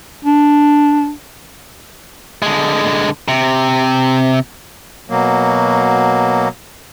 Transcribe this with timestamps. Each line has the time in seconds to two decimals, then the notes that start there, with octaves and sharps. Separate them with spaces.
0.25 D4
2.42 D3 G#3
3.28 C3
5.10 B2 F#3 A#3